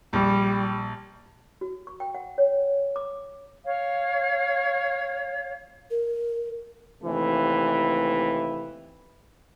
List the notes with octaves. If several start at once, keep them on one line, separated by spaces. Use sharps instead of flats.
A#1 G3
F#4
C#6
G5
F#5
C#5
D6
C#5 F5
A#4
D#2 C3 E3 A3